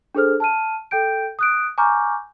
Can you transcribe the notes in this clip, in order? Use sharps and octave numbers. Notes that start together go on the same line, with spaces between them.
D4 G#4 A4 C5 F6
A5 F6 D#7
A4 G5 G6 D7
D#6 F#6 D7
G#5 A#5 C#6 D6 F6 G6